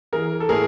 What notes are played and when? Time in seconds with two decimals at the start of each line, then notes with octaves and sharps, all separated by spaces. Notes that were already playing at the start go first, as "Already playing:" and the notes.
0.13 E3 G#4 A#4
0.40 A4
0.49 A2 G#4 A#4